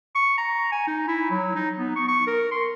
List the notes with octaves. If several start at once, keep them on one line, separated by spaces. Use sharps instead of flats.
C#6
A#5
G#5
D#4
E4
F#3
D#4
B3
C#6
C#6
A#4
C6